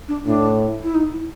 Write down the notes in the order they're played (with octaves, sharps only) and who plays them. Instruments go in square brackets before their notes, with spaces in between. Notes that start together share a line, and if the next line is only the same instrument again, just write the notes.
[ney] D4
[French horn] A2 [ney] D4
[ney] E4
D#4
E4